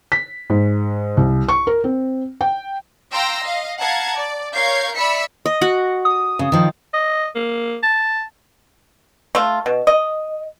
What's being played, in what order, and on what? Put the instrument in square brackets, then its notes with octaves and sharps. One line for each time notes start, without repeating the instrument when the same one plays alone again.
[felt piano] B6
G#2
C2
C#6
A#4
C4
G5
[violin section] F5 G5 A#5 C6 E6 A#6
D#5 F5
F5 F#5 A5 A#5 G#6
D5
A#4 C#5 F5 G6 G#6 C7
D5 E5 B5 E6 B6 C#7
[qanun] D#5
F#4 F#5
[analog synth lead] D#6
[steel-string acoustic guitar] C#3
D#3 F3
[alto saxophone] D#5
A#3
A5
[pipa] A3 F4
B2
D#5